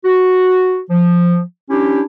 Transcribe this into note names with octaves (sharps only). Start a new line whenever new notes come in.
F#4
F3
C#4 D4 E4 G4